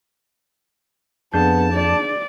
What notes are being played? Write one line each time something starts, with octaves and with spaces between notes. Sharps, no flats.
F2 B3 D4 G#4 A5 G6
D5